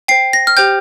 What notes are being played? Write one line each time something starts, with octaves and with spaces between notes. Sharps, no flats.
C5 G5 C7
A#6
F6
G4 C5 G5 G6